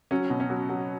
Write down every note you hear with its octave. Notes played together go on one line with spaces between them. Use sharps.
F#3 C#4
B2
C#4
F#3
F#3